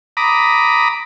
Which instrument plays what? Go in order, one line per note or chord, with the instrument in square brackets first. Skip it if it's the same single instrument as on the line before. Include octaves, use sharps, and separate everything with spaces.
[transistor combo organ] A#5 B5 D6 D#6